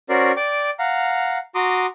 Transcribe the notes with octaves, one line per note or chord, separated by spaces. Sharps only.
C#4 F#4 A#4 C5 D5
D5 G5 D6
F5 F#5 A#5
F#4 A#5 C6 D6 D#6